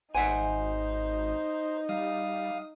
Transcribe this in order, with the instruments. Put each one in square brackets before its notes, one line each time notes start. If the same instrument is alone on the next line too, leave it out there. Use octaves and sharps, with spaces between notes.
[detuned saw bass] G#1 [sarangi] D#4 [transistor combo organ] C5 [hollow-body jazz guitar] E5 F#5 G#5
[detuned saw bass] G3 [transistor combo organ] F5 D#6